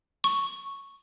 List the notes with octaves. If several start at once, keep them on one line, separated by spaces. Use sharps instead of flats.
C#6